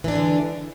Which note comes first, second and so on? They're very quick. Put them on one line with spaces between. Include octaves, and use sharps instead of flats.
E3 D4 G#3 D3